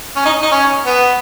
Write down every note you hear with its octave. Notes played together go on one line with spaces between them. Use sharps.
C#4
D#4
D#4
C#4
B3